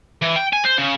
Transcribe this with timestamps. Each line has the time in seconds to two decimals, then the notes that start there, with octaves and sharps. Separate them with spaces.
0.22 E3
0.36 G5
0.53 G#5
0.65 C5
0.78 C#3